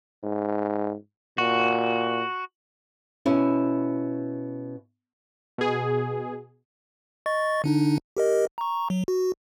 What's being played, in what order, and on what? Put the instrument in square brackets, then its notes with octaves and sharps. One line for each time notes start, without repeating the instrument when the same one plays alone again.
[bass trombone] G#2
[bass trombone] A#2 [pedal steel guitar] F#4
[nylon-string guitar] B2 C#4 E4
[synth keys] B2 G#4
[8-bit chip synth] D#5 C#6 A6
D3 D4 D#4
G4 A#4 D#5
A#5 C#6
F#3
F#4